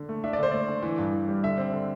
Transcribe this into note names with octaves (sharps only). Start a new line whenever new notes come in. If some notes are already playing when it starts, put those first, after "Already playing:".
Already playing: D3
A3
D4 E5
D5
D3 C5
A3 D5
D3
E3
G2
E3
G3
D3 E5
C4
D3